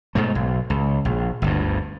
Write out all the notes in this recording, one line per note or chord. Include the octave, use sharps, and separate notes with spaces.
G#2 B2 A3
B1
C#2
A#1
G1 D2 G2